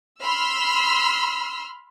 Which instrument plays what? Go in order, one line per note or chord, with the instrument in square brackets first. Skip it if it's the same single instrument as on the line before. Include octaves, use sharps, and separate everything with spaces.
[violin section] B5 C6 E6 F6